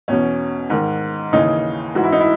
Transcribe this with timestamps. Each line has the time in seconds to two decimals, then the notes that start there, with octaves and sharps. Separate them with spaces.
0.08 E2 B2 C#4
0.70 G#2 D#3
1.33 D#2 C#3 E3 D#4
1.95 G#2 E3 F#4
2.04 E4
2.12 D#4
2.20 E4